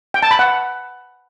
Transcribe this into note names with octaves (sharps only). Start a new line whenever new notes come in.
G5
A5
B5
F#5